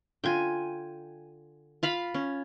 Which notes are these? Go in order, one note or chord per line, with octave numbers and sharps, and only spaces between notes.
D3 F4 G5 G#5
F4 F5 B5
C#4